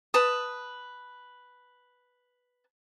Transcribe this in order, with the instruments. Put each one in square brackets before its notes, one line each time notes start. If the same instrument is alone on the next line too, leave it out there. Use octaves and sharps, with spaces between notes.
[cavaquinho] B4 A5 D#6